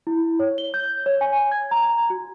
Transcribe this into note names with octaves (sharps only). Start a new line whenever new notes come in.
E4
C#5
G7
G6
C#5
G#5
G#6
A#5
F#4